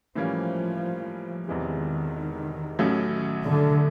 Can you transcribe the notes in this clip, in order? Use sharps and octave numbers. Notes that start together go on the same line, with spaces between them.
A2 E3 F3 G3 A#3 C#4
E1 E2 C3 D#3 E3 G#3
A1 A2 F#3 A3 C#4
D3